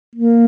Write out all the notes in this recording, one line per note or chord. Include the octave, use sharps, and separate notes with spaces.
A#3